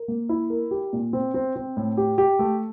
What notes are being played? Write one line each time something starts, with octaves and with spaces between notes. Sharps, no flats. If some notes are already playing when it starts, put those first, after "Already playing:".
Already playing: A#4
A#3
E4
A#4
G4
A#2
C4
C4
C4
A2
G4
G4
A3